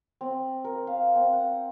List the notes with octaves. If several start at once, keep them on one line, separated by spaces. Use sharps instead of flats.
C4
A#4
F5
C4
F#5